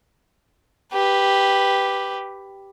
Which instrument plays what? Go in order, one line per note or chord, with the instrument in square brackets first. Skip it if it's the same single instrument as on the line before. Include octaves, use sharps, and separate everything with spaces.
[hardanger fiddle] G4 B4